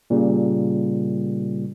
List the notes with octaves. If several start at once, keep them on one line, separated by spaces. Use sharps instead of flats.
A#2 C#3 G3